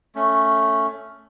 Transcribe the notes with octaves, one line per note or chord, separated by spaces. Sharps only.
A3 C#4